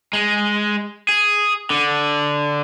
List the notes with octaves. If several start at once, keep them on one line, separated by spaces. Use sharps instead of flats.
G#3
G#4
D3